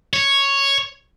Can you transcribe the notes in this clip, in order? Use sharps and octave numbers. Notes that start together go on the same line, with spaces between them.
C#5